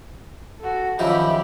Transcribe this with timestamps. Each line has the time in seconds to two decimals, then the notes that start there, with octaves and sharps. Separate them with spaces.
0.59 F#4 A4
0.99 F#2 D#3 F3 G4 E5 B5